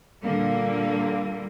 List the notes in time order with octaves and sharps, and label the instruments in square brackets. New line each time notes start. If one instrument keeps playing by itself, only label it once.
[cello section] A#2 D3 G3 A#3